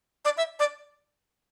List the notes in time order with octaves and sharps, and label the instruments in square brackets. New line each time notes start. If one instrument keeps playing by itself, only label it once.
[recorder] D5
E5
D5